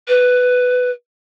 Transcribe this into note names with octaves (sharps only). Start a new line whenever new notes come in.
B4